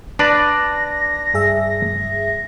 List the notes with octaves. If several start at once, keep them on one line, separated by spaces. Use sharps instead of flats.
D4 B4 D5 A#6
G2 G#4 E5